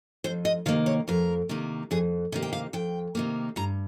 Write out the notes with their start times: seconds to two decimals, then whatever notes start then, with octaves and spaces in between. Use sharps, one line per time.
0.24 F2 C5
0.45 D#5
0.66 C3 D#3 A#3 F5
0.86 C#5
1.08 F2 A#4
1.49 C3 D#3 A#3
1.91 F2 G#4
2.32 C3 D#3 A#3 G4
2.43 G5
2.53 F5
2.73 F2 G5
3.15 C3 D#3 A#3
3.56 G2 A#5